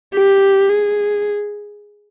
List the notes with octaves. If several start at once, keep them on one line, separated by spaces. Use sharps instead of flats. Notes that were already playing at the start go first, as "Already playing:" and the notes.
G4
G#4